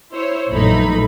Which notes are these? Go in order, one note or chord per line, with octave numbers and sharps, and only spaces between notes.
E4 C5 C#5
A#1 F#2 E3 A3 D#4 B5